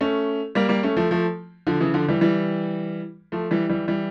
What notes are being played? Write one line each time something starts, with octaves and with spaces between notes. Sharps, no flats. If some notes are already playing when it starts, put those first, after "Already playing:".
A3 C#4
G3 A#3
G3 A#3
A3 C#4
F3 A3
F3 A3
D3 F3
C#3 E3
D3 F3
E3 G3
E3 G3
F3 A3
E3 G3
E3 G3
E3 G3